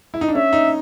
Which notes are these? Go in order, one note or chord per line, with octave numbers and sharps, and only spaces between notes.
E4
D#4
D4
C#4 E5
D#4